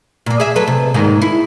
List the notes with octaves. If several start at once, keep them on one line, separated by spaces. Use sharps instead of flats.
A#2 A#3
G#4 E5
F#3 A4 B4
C3
D#2 G#2 D#3
E4